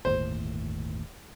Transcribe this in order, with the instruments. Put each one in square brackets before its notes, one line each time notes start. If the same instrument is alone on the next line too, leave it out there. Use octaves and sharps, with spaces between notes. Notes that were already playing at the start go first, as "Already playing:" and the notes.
[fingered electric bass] G1 D#2 A2 [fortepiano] C5